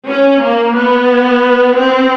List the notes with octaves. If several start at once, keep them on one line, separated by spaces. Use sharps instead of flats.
C#4
A#3
B3
C4